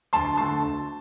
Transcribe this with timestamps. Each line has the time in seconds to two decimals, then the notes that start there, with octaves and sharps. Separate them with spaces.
0.13 D2 A5 C6
0.38 D3 A3 A5 C6
0.62 D2